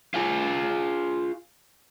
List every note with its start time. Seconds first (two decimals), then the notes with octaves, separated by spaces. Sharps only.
0.14 F4 G#4